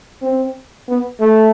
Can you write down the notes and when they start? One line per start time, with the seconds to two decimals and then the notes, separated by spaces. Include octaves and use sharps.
0.22 C4
0.88 B3
1.20 A3